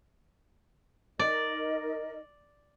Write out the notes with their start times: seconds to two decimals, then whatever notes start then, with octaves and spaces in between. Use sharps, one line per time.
1.19 D#4 A#4 D5 D#5